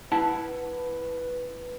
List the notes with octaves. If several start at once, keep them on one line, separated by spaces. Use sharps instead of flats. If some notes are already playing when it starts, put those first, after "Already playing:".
E4 B4 F#5 A5